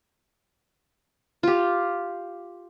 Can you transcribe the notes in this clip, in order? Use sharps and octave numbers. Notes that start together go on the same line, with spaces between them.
F4 G4